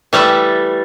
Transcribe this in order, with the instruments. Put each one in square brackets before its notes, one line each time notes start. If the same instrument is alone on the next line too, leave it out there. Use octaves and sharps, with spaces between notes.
[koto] E3 G3 A3 E5